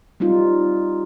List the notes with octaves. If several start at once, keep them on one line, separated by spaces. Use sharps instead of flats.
G3 C4 D#4 F4